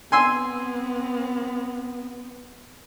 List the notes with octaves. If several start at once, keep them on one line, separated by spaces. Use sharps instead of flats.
B3 C4 G#5 C6 E6